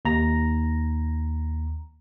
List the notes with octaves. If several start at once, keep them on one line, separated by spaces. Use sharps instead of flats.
D#2 A#5 A#6